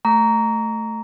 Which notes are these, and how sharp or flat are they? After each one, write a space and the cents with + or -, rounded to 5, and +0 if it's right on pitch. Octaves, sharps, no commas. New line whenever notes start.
A3 +0 A#5 +0 C#6 +40